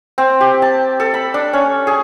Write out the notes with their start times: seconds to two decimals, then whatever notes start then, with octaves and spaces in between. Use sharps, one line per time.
0.18 C4
0.41 G4
0.62 A5
1.00 A4
1.14 B5
1.34 D4
1.53 C#4
1.87 G#4